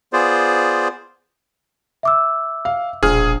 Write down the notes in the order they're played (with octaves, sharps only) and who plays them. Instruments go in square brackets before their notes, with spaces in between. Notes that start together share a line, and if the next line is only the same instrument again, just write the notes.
[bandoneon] B3 F4 G#4 C5 D5
[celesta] E5 D6 E6
[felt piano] F5
[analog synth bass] E1 [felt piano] A#1 F6 [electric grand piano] G#4